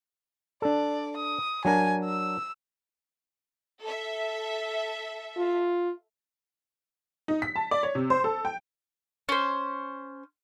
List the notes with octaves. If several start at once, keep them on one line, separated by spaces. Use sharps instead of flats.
D4 A4 D5
D#6
F#3 D4 A#4 G#5
E6
A4 E5
F4
D#4
B6
A5
D5
C#5
C3
C5
A4
G5
C#4 C5